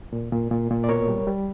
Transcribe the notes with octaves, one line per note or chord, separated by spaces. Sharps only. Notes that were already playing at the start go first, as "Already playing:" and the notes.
A#2
A#2
A#2
A#2
D5
B2 A#4 C#5
G3
G3